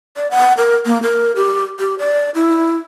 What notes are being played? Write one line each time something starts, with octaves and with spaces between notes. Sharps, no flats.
D5
F#5
A#4
A#3
A#4
G4
G4
D5
E4